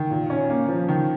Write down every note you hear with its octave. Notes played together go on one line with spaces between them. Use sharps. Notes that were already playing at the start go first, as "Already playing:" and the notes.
Already playing: D#3
A#2
C#4
A#3
F3
D#3